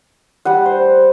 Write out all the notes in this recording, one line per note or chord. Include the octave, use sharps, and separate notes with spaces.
G3 F#5
C5